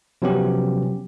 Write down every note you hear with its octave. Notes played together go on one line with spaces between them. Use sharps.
C3 F3 F#3 B3 C#4 G4